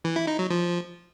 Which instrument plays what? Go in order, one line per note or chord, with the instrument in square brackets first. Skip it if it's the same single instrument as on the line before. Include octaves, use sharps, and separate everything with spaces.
[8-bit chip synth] E3
E4
D#4
F#3
F3